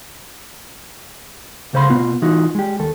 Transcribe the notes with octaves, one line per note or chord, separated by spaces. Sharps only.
D2 C#3 C5 F5 B5 C6
B2 B3 F4
E3 D#4 F4 F#4
G#3 G4
D#2 A4